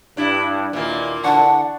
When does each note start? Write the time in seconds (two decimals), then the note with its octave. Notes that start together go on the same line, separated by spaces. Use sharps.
0.17 G2 D4 E4
0.73 D#2 A#2 D#3 E3 A#3
1.24 D3 E3 D4 F#5 A5 C#6